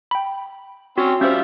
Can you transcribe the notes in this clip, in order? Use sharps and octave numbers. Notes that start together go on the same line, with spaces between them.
G5 B5
C4 C#4 F#4
G3 C#4 F4 C5 E5